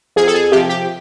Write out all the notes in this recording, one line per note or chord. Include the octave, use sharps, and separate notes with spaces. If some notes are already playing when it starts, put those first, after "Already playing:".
F2 G#4
A4
G#4
C3 F3 G4
G4